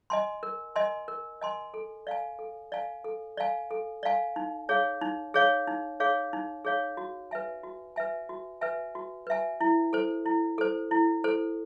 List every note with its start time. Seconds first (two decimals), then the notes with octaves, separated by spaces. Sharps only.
0.10 D#5 G#5 C6
0.43 A#4
0.76 D#5 G#5 C6
1.08 A#4
1.41 D#5 G#5 C6
1.74 A4
2.07 D5 F5 G#5
2.39 A4
2.72 D5 F5 G#5
3.04 A4
3.37 D5 F5 G#5
3.71 A4
4.03 D5 F5 G#5
4.36 D#4
4.69 G#4 C#5 F5
5.01 D#4
5.34 G#4 C#5 F5
5.67 D#4
6.00 G#4 C#5 F5
6.33 D#4
6.65 G#4 C#5 F5
6.97 F#4
7.31 B4 E5 G#5
7.63 F#4
7.96 B4 E5 G#5
8.29 F#4
8.61 B4 E5 G#5
8.95 F#4
9.27 B4 E5 G#5
9.61 E4
9.93 A4 C5
10.26 E4
10.58 A4 C5
10.91 E4
11.24 A4 C5